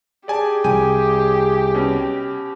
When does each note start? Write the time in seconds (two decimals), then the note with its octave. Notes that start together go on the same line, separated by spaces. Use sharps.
0.28 G4 G#4 D5 G#5 A5
0.64 C2 G5 G#5 D#7
1.74 B2 C#4